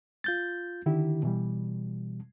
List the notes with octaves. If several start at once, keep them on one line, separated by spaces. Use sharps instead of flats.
F4 G6 A6
D3 D#3 E4 G4
B2 E3 G3